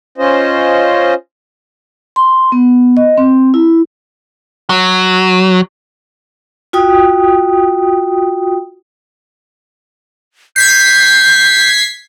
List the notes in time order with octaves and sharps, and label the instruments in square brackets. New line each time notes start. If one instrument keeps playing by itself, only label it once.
[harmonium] C#4 F4 C5 D#5
[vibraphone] C6
B3
D#5
C4
E4
[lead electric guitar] F#3
[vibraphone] F4 F#4 G5 D#6
[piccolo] G6 [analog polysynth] G#6 B6 C7